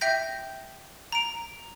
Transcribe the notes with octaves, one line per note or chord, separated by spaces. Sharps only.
E5 G5 G6 A#6
A#5 D7